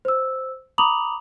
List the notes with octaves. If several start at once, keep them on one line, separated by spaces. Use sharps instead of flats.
C5 E6
A#5 B5 D6 D#6 F7 F#7